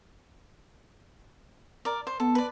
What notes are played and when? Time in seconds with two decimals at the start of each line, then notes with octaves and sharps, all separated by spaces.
1.85 A#4 D5
2.07 C5
2.20 B3 A4
2.35 B4 D5